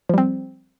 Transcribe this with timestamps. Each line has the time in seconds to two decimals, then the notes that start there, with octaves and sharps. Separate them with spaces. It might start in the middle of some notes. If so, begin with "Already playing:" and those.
0.09 F3
0.14 G3
0.18 C4